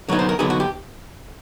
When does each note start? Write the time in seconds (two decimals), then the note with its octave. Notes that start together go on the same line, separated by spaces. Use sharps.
0.08 D3 F#3 B3 D#4 C#5
0.19 C5
0.29 A#4
0.39 D3 F#3 B3 D#4 G#4
0.50 F#4
0.60 G4